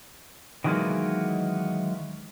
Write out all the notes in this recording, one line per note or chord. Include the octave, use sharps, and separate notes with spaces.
D#3 E3 F#3 G#3 A#3 B3